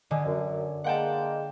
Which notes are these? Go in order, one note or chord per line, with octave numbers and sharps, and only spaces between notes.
D3 D#5 G#5
F#2
G#3 A#3 F#5 G5 A5